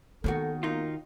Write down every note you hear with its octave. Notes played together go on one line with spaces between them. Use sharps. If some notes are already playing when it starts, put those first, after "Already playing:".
D#2 D#3 B3 F#4 A4
A#3 D#4 F4